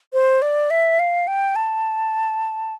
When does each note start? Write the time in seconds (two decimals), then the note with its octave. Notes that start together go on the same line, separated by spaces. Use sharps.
0.13 C5
0.42 D5
0.70 E5
0.99 F5
1.27 G5
1.56 A5